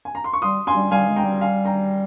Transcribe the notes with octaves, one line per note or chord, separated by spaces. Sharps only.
G#5
A#5
C6
C#6
G3 C6 D#6
G#5 C6
G3
G3 F5 G#5
G#3
G5 A#5
G3
F5 G#5
G5 A#5